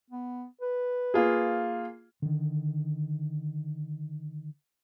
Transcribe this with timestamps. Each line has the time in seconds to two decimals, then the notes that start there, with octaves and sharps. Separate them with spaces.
0.10 B3
0.61 B4
1.14 A#3 F4 G#4
2.22 D3 D#3